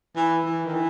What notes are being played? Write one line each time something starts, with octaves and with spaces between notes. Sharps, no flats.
E3
E3
D#3
E3